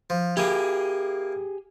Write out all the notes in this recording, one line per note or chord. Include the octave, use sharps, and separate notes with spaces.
F3
A#3 E4 G4 G#4